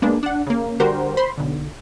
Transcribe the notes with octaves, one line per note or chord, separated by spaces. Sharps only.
G#3 A#3 B3 D4
D4 F#5
C#3 A#3
D3 G3 F#4 G4 A#4 C5
C5 B5 C6
B1 D3